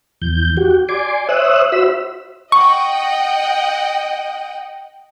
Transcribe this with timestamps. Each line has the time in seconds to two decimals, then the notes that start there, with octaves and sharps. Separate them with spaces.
0.22 E2 G6
0.57 F#4 G4
0.89 D5 G#5 C6 D6
1.29 C5 C#5 E5 D#6 E6 F#6
1.72 F#4 C5 E5 B5 E6
2.52 D#5 F#5 G5 C#6